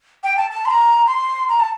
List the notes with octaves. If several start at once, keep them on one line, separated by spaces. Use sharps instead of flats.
G5
A5
A5
C6
A#5
C6
A#5
A5